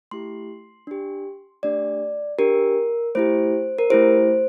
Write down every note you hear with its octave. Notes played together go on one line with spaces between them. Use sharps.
A3 E4 G4 C6
D4 G4
A3 D4 G4 D5
D4 G4 A#4
A3 E4 G4 C5
A#4
A3 E4 G4 C5